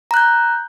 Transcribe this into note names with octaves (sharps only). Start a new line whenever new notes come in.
A#5 F#6 G6